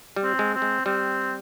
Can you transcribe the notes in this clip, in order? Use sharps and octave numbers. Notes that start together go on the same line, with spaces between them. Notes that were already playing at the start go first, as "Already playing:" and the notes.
G3
C4
G#3
C4
G#3
G3 C4